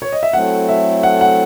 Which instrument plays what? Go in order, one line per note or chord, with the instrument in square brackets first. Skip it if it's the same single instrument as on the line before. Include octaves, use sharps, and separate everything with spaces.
[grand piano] C#5
D#5
E5
[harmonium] F#3 A3 C4 E4 A4 [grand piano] F#5
[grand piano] E5
F#5
F#5